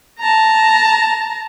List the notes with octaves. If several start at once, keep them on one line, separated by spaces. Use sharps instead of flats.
A5 A#5